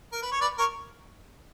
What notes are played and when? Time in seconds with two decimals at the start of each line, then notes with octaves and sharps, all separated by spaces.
0.12 A#4
0.22 B4
0.32 C#5
0.41 B4 D5
0.58 A#4 C#5